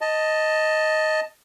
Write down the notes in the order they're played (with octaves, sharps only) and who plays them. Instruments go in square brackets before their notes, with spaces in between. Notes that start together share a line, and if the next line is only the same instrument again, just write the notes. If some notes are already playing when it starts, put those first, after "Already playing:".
[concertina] D#5 A5